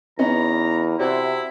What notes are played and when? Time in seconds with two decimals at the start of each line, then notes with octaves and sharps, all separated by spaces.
0.19 E2 B3 C#4 D#4 A#5
0.99 C3 E4 F#4 C5 D5